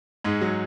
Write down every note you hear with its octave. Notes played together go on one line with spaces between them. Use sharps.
G#2 G#3
F#3